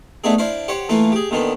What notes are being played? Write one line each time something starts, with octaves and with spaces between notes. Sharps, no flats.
A3 B3 D4 D#4 G#4
D4 E4 C5 F5
G4 C5 C#5 F#5
E3 A3 A#3 F4
G4 G#4
A#2 D3 D#3 B3